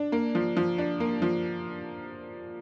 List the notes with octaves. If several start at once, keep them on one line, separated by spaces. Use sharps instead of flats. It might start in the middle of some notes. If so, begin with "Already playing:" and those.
Already playing: D4
A#3
F3
F3
D4
A#3
F3